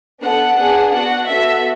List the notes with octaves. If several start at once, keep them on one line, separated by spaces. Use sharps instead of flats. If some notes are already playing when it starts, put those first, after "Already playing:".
B3 D4 A4 F#5
B3 D4 G#4
B3 D4 F#4 F#5
B3 F#4 A4 E5